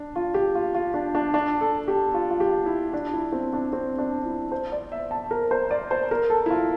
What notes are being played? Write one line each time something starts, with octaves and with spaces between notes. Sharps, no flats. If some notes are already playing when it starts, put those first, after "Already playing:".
Already playing: D4
F4
G4
F4
F4
D4
D4
D4
A4
G4
F4
F4
G4
E4
D4
E4
C4
D4
C4
D4
E4
C5
D5
E5
A5
A#4
C5
D5
C5
A#4
A4
E4
F4